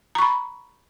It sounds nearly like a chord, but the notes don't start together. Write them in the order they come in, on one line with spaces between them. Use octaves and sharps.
A#5 C#6 B5